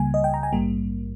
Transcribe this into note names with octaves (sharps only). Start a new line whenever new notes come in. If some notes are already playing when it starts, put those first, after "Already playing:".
Already playing: C#2 C#3 G3 A#3 G#5
D#5
G5
A#5
G#5
A#1 G#2 G3 A#3